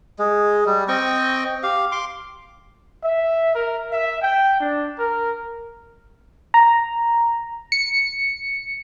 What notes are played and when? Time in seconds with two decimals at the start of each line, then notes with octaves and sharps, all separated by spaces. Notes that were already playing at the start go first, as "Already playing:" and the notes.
0.19 G#3
0.66 G3
0.88 C4 D#5 G5 C#6
1.63 G4 F5
1.92 C6 D6
3.02 E5
3.55 A#4
3.91 E5
4.21 G5
4.59 D4
4.98 A#4
6.54 A#5
7.72 C#7